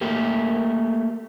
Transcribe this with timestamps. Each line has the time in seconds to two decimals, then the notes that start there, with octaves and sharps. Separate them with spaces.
0.01 A3 A#3 G4